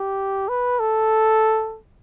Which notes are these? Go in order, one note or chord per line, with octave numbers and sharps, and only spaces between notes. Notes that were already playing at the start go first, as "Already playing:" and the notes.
Already playing: G4
B4
A4